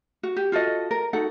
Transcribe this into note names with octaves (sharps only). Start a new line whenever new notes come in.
F#4
G4
F4 F#4 A4 D#5
A#4
D#4 F#4 A4 F#5